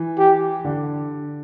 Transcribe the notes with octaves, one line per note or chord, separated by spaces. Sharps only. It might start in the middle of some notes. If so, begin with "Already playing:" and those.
Already playing: E3
G4
D3